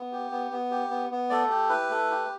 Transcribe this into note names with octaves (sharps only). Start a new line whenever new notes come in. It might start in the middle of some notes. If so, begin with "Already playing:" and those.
Already playing: B3
G4
B3
B3
G4
B3
B3
A3 D5
G4
E4 B4
A3
G4